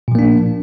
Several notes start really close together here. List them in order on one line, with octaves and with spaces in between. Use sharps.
A#2 F3 A#3 D4